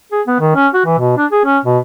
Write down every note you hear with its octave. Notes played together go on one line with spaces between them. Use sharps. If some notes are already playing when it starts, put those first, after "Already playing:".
G#4
B3
D#3
C#4
F#4
E3
B2
D4
G#4
C#4
B2